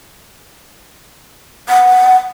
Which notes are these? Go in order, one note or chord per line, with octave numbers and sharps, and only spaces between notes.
F#5